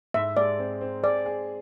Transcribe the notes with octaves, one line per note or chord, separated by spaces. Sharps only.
G#2 E5
G#3 D5
C4
C4
G#4 D5
G#4